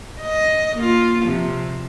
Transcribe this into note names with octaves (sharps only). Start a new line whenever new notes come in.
D#5
A#3 F4
C3 F3